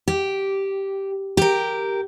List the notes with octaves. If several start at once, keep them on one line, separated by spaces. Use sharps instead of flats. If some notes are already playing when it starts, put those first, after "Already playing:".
G4
G4 A#4